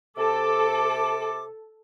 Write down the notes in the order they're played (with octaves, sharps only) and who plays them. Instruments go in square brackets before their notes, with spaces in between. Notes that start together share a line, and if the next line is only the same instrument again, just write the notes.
[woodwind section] C3 A5 D6 [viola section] A4